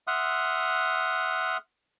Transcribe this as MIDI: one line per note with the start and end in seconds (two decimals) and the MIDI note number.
0.07 1.57 76
0.07 1.57 78
0.07 1.57 84
0.07 1.57 87
0.07 1.57 89
0.07 1.57 90